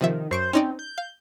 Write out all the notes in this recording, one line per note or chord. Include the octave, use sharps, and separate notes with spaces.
C3 D#3 F3 E5
F#2 C5 C#6 D7
C4 C#4 D#4 D5
G6
F5